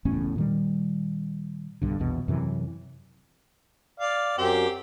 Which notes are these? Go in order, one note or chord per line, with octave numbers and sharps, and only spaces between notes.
F#1 E2 A2 C#4
A#2 D#3 G3
B1 G2 D3
A#1 E2 B2
F#2 C3 E3
D5 F5
F#2 C4 G4